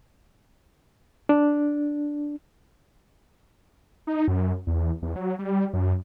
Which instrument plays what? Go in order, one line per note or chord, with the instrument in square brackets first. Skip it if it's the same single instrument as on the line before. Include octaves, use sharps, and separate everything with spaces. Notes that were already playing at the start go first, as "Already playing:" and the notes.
[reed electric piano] D4
[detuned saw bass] D#4
F#2
E2
E2
F#3
G3
F#2